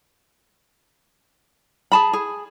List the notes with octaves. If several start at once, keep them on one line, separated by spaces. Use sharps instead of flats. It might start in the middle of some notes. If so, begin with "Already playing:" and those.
G#4 A5 B5
G#4